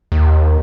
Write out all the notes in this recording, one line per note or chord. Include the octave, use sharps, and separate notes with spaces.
D#2